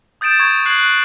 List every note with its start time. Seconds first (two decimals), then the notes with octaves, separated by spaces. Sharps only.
0.21 D#6 G6 A6 D7 E7
0.39 C#6 G#6
0.65 C#6 F#6 G#6 C7 F#7
0.78 F#6